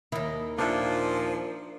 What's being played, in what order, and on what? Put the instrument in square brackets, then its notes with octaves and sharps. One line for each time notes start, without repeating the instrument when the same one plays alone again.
[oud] D#2 D#3 [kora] E4
[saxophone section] A#2 F4 [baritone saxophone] F3 [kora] D4 C#5 E5